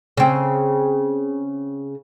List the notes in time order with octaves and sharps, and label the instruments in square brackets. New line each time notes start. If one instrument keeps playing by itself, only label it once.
[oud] C#3 C4